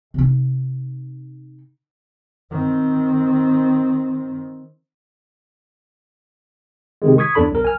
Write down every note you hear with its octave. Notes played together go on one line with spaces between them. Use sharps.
C3 D#4
D#3 C4
C3 D#3 G#3
C#6 D#6 G#6 B6
E2 D4 A4 B5
B1 A#4
G#5 F6